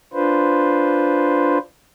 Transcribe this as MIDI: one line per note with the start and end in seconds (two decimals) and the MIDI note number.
0.13 1.58 62
0.13 1.58 65
0.13 1.58 71
0.13 1.58 72